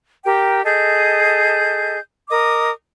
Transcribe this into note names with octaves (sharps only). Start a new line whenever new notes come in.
G4 A#4 G5
G#4 A4 D#5 G6
A#4 D#5 D6 D#6